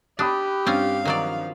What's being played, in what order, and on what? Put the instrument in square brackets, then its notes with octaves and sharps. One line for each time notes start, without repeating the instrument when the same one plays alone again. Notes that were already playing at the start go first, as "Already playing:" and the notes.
[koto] D4 [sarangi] G4 [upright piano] B5 D#6 F#6
[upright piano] G2 [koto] C4 C#4 F4 [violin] F5
[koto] D#3 F#3 D5 [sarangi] F3